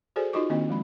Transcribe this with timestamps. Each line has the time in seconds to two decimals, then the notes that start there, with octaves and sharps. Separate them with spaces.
0.16 F#4 G#4 A4 C5 D5 G#5
0.33 D#4 F4 F#4 D#5 C#6 D6
0.50 D#3 A#3 C4 D4 D#5
0.69 F3 G#3 B5